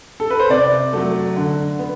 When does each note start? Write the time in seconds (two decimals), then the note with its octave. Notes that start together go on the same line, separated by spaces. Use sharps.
0.20 A4
0.30 B4
0.40 C5
0.49 C3 D5
0.93 F#3 A3
1.36 D3
1.79 B3